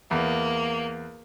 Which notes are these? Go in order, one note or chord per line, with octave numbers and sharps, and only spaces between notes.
E2 A#3